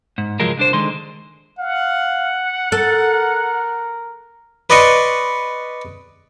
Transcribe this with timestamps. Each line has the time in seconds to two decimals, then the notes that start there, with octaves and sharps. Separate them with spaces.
0.18 G#2
0.40 C#3 F3 F#3 G#3 A#4
0.58 C2 D4 C5
0.73 D3 D#3 G#3 C6
1.59 F5 F#5
2.72 A4 A#4
4.70 B4 D5 D#5 C6 C#6